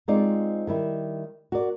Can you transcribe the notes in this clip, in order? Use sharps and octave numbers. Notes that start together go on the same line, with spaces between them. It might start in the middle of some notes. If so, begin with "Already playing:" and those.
G#3 C4 D#4 F4 D5
D#3 G3 E4
F#4 A#4 D5